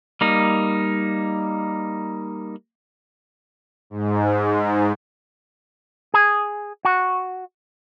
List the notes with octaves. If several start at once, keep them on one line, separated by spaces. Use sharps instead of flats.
G3 A#3 D#4
G#2
G#4
F#4